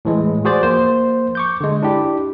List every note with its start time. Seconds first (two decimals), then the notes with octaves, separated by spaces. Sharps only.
0.05 A2 E3 G#3
0.45 F#4 G#4 C5 D5
0.63 F3 A#3 C5
1.35 C#6 D6 G6
1.60 D3 G#3
1.83 D4 E4 G4